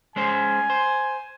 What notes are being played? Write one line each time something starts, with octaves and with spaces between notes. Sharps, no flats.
G#3 C#4 C5 G#5
C5